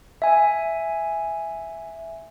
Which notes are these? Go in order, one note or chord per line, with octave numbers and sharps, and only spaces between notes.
E5 G#5